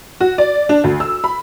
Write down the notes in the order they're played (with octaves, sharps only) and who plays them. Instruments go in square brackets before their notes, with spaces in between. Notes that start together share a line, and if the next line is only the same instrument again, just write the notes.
[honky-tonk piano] F#4
D5
D4
D2
E6
B5